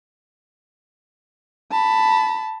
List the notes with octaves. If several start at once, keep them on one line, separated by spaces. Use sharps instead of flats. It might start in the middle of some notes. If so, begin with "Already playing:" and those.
A5 B5